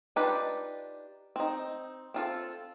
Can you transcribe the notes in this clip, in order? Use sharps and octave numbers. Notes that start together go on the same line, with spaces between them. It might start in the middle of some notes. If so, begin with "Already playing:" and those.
D4 D#4 F4 G4 B4
C4 D#4
C4 F4 A4